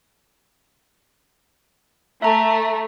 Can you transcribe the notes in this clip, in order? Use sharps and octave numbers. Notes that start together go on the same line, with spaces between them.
A3 E5 A#5